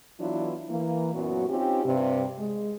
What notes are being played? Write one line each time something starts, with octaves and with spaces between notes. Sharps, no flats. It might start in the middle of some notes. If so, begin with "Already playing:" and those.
E3 F#3 B3 D4 E4 F4
E3 A#3
F#2 A#2 F#3 B3 F#4
C4 C#4 D#4 F4 G4
G2 C3
G#3